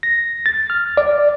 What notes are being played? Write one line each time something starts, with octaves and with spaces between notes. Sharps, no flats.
A#6
A6
F6
D5